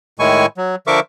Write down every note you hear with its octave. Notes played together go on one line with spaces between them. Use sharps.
A2 D#3 G#3 E4 G#5 C#6
F#3
D3 F3 A#4 E5 C#6 D6